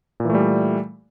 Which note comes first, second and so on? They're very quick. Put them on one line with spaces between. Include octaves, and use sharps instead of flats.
A#2 E3 A3 G3